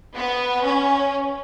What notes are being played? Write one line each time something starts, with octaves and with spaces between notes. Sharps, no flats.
B3
C#4